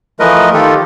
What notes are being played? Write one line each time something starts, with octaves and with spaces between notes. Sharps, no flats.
E3 F3 A3 A#4 B4 D#5
D#3 F4 G4 A4